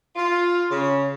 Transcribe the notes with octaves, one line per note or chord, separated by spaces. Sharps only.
F4
C#3